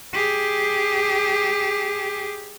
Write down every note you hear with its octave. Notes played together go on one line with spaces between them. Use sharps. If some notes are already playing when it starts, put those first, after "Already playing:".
G4 G#4